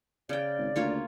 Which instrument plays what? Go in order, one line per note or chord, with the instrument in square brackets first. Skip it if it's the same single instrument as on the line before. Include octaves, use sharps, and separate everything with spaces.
[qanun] C#3 G5 [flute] D5
[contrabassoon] G#1
[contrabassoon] D2 [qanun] A#3 F4 C#5